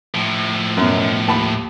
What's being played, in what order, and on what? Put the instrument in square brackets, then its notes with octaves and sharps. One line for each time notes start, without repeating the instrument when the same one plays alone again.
[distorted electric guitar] A2 F3
[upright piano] F#2 B2
D#2 A5 B5